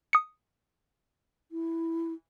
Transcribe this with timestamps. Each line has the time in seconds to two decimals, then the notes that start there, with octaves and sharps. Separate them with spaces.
0.13 D#6 C#7
1.51 E4